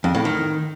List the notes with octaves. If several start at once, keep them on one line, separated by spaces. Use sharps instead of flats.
F2
A2
D#3